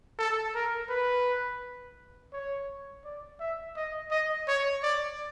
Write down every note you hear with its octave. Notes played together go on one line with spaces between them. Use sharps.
A4
A#4
B4
C#5
D5
E5
D#5
D#5
C#5
D5